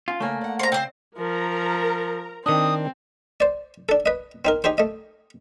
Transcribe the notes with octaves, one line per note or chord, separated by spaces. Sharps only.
C#4 F4
C#3 A3 A#3 G#5
D5 F#5
C5 A#5 C6
C#3 C4 C5
F3 A#4 A#5
D#3 C4 D4 D#6
C5 D5
D4 A4
B4 D#5
C4 D#4 A#4
D#4 G4 G#4 C5
A3 D#5